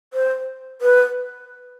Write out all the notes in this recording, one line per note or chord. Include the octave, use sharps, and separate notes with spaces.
C5
B4